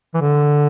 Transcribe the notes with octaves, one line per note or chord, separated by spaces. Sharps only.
E3
D3